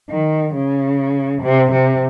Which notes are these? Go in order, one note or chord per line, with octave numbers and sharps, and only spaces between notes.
D#3
C#3
C3
C3